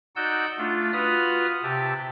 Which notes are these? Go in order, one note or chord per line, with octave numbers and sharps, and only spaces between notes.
D#4 F#4 D5 F#5 E6 G6
A3 D4 F4
F4 F#4 B4 B5 D#6 F6
C3 G4 E5 A5